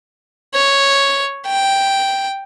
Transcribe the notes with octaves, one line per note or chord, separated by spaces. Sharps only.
C#5
G5